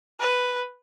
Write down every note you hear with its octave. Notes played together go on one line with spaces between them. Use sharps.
B4